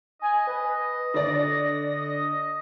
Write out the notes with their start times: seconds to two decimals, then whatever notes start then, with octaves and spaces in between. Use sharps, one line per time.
0.22 D#5 G#5
0.47 B4
1.14 D3 D5 A#6
1.92 D#5